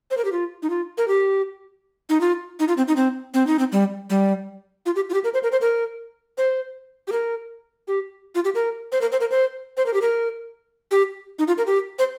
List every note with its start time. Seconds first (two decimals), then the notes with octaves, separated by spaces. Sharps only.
0.11 C5
0.17 A#4
0.25 G4
0.32 F4
0.63 D#4
0.70 F4
0.98 A#4
1.08 G4
2.09 D#4
2.21 F4
2.60 D#4
2.68 F4
2.77 C4
2.88 D#4
2.96 C4
3.34 C4
3.47 D#4
3.59 C4
3.72 G3
4.10 G3
4.86 F4
4.96 G4
5.09 F4
5.14 G4
5.24 A#4
5.34 C5
5.43 A#4
5.52 C5
5.61 A#4
6.38 C5
7.08 G4
7.12 A#4
7.88 G4
8.35 F4
8.45 G4
8.55 A#4
8.92 C5
9.01 A#4
9.12 C5
9.20 A#4
9.31 C5
9.77 C5
9.86 A#4
9.94 G4
10.02 A#4
10.91 G4
11.39 D#4
11.48 F4
11.58 A#4
11.67 G4
11.99 C5